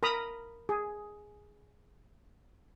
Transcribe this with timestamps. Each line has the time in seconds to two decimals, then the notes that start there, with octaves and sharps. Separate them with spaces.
0.03 A#4 A#5 B5 D#6
0.69 G#4